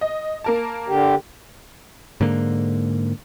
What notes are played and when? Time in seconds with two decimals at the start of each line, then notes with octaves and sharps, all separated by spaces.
0.01 D#5
0.44 A#3 A#4 A5
0.88 D3 G4
2.21 G#2 D3 A#3